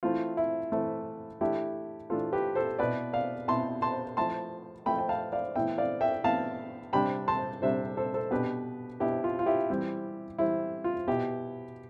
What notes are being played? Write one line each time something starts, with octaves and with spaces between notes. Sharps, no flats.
E3 A3 C4 E4 F4
E4
E3 A3 C4 E4
E3 A3 D4 E4 G4
E3 A3 D4 F4 A4
G4 B4
A4 C5
B2 B3 E4 B4 D5
D5 F5
B2 B3 E4 A5 C6
A5 C6
F3 A3 E4 A5 C6
F3 A3 E4 G5 B5
G5
F5 A5
D5 F5
A2 E3 B3 E4 E5 G5
D5 F5
E5 G5
A2 E3 B3 E4 F5 A5
C3 G3 D4 G5 B5
A5 C6
C3 G3 D4 C5 E5
A4 C5
A4 C5
B2 B3 D4 G4 B4
B2 B3 D4 E4 G4
F4
F4
E4 G4
E3 G3 C4 E4
E3 G3 C4 E4
F4
B2 B3 E4 G4